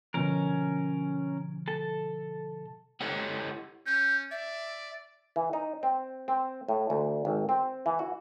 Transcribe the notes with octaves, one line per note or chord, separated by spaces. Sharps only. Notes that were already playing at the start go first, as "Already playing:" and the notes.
B2 D3 F3 C#4 A#4
A4 A5
E4 G4 A4 C#5 D#5 F#5
C#4 G6
D5 E5
E3
D#4
C4
C4
A2
D2
G#1
C4
E3
F#4